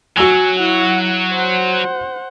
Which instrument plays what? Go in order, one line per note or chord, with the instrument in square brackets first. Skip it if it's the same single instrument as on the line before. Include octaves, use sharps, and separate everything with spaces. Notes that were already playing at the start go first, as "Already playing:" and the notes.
[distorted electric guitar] F#3 [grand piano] F#4 E6 F7 [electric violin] G#5
[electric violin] E4 F#5
C5 F#5